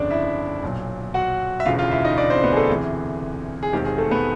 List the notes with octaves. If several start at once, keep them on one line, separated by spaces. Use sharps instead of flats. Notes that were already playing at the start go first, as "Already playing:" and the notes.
Already playing: G1 F2 C#3 D4 D5
E4 E5
B1 A#2 F#3
F#4 F#5
E5
E1 D2 C#3 E3 F4 F5
F4 F5
E4 E5
D#4 D#5
D4 D5
C4 C5
B3 B4
G#4
A3 A4
D2 C3 E3 G#4
G#4
E1 D#2 D#3 G#3 C4 G4
G#4
A3 A4
B3 B4